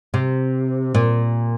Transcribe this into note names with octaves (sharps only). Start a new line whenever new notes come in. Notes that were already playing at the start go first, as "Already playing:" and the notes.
C3
A#2